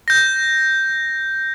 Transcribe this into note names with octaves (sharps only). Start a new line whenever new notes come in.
G6 A#6